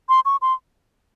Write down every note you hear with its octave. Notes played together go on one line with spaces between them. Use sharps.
C6
C#6
C6